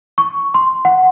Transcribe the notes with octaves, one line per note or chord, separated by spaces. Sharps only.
C#6
C6
F#5